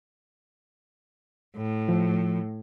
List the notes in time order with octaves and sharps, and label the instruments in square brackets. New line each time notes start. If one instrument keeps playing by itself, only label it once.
[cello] A2
[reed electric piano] F3